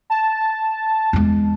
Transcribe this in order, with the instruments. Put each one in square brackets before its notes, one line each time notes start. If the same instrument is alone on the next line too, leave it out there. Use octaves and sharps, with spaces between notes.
[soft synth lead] A5
[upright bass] E2 G#3